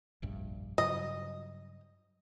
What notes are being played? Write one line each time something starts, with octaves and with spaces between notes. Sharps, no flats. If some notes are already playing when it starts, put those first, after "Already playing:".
F1 A#1 G2
G2 C#3 F#3 D#5